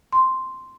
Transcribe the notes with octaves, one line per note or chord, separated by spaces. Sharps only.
C6